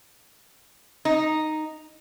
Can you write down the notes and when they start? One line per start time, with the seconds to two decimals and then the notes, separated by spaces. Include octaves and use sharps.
1.05 D#4